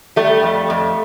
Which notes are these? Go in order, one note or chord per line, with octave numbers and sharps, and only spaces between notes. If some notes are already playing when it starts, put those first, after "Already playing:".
G3 A3
F2
F2